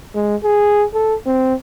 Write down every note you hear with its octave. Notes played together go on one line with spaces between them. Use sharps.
G#3
G#4
A4
C4